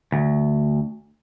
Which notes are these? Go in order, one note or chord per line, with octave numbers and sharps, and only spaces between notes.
D2